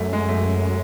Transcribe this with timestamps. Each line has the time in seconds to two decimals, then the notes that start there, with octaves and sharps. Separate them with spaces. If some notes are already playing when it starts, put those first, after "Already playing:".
Already playing: F#2 A3
0.13 G#3
0.28 A3